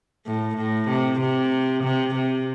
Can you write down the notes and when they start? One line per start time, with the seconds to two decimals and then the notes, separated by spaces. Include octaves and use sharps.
0.26 A2
0.57 A2
0.89 C3
1.20 C3
1.83 C3
2.15 C3